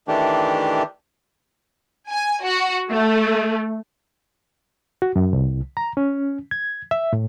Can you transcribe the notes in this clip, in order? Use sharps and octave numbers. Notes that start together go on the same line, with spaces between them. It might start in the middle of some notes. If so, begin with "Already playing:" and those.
D#3 E3 A3 D4 G4
G#5
F#4
A3
F#4
F#2
C2
A#5
C#4
G#6
E5
A2